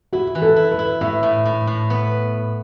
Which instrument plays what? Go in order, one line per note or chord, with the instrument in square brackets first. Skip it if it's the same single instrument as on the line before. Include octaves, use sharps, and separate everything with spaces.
[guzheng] E4 [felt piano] F#4
[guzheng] E3
[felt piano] A4
[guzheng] E4
[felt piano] B4
[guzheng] E4
[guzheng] A2 [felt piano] E5
[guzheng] A2
A2
A2
B3